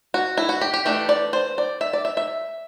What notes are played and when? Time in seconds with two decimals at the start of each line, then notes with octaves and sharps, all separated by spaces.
0.14 F#4
0.37 E4
0.49 F#4
0.61 G4
0.74 G4
0.85 E3 A3 D4 G4
1.09 D5
1.33 C5
1.58 D5
1.81 E5
1.93 D5
2.05 E5
2.17 E5